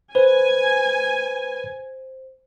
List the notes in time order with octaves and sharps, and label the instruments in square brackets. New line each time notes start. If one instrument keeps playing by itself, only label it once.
[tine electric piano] B4 [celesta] C5 [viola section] G#5